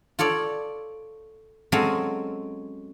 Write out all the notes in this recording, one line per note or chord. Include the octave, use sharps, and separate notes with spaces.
F4 A4 C#5 D5
F#3 G#3 C4 C#4 A4 F5